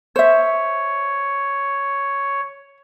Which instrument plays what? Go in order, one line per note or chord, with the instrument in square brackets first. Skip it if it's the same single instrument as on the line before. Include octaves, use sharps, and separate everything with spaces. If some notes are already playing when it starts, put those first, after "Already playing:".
[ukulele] C5 E5 [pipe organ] C#5